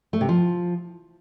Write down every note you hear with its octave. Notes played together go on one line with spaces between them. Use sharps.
A3
C3
F3